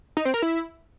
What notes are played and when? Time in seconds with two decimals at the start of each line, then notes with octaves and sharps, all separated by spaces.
0.17 D#4
0.25 C4
0.34 A#4
0.42 E4